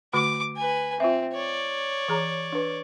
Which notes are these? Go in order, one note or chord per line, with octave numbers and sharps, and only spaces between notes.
D3 A3 F#4 D6
B4 G#5
C4 F4 E5
C#5 D5
E3 G#4 A#5
D4 B4